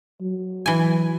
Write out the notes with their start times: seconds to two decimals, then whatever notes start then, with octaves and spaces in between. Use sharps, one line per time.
0.21 F#3
0.66 E3 G#5